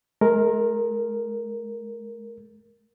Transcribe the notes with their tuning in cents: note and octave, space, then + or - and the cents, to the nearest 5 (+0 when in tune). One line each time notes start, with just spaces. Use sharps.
G#3 +45 A#4 +0